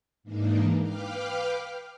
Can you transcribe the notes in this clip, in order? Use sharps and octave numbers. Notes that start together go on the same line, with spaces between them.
G#2 E3 A#3 D4 D#4
B4 F5 G5 D6 F6